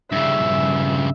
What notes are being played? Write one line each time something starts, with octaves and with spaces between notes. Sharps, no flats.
G2 C#3 E5